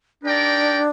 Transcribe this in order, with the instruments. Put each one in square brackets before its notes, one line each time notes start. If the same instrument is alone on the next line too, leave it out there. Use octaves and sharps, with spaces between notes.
[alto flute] D4 [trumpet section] D#4 G4 A#4 D5 G5